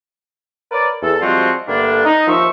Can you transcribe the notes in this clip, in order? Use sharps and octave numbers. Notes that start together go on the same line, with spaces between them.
A#4 B4 C#5 D5
E2 A4
F3 G3 G#3 C4 F4 F#4
G2 D3 A3 A#3 D4
D#4
D#2 F3 C5 E5 C#6 E6